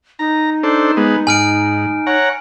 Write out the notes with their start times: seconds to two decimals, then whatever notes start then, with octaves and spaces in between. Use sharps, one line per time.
0.19 D#4 A#5
0.63 D4 A4 C5
0.97 G#3 B3
1.27 G#2 G#5 F6 D7
2.07 C#5 F#5 A#5